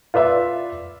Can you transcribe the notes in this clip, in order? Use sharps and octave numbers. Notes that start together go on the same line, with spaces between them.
F4 B4 D5 E5